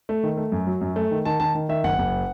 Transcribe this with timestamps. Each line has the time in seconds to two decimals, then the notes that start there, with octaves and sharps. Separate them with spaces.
0.09 A3
0.23 D#3
0.37 A3
0.52 F#2
0.67 F#3
0.81 F#2
0.96 A3
1.11 D#3
1.25 D#3 A5
1.40 D#3 A5
1.55 D#3
1.69 D#3 E5
1.84 F#1 F#5
1.98 F#1